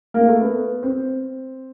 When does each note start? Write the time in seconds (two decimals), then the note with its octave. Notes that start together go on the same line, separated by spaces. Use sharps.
0.14 A#3
0.28 A3
0.41 B3
0.83 C4